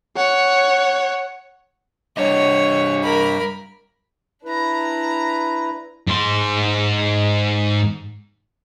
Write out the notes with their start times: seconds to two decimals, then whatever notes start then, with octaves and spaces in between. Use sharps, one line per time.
0.16 C#5 F#5
2.17 G3 D4 C#5 D#5
3.03 A#4 B5
4.45 D4 E4 B4 A#5
6.07 G#2 C6